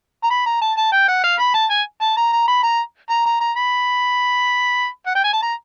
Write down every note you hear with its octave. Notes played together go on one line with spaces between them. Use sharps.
A#5
B5
A#5
A5
A5
G5
F#5
F5
B5
A5
G#5
A5
A#5
A#5
B5
A#5
A#5
A#5
A#5
B5
F#5
G5
G#5
A5
A#5